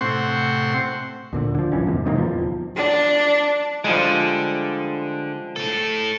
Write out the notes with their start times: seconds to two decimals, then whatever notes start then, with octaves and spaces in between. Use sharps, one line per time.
0.01 A2 C3 C4 F#5 C6 C#6
1.33 D2 A#2 D3
1.55 D3 F3
1.72 A#1 F#2 E3 C#4
1.87 E2 G#2 C3
2.05 C3 D#3 G#3 A#3
2.18 D1 E2 F3
2.76 D4
3.84 D3 F3 G3 G#3
5.56 A2 A4